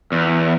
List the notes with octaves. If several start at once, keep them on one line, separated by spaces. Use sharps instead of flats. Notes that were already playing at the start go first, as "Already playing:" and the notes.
E2